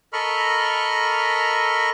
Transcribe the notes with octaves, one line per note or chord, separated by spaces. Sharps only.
A4 A#4 D#5 B5 C#6 F6